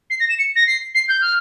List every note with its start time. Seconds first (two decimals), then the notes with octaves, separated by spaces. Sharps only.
0.10 C7
0.20 A#6
0.29 E7
0.38 C#7
0.55 A#6
0.66 C7
0.94 C7
1.08 G6
1.21 F6